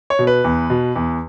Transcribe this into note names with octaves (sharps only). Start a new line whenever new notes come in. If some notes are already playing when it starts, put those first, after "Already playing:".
C#5
B2
B4
E2
B2
E2